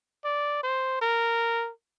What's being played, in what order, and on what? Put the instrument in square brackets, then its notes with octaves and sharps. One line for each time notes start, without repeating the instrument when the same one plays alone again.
[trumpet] D5
C5
A#4